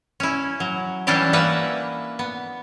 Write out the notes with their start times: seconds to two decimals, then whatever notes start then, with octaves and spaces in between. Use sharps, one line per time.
0.20 C#4 E4
0.60 F#3
1.07 E3 G3 C#4 D4 E4 G4
1.33 A#3 B4 E5 F#5
2.19 B3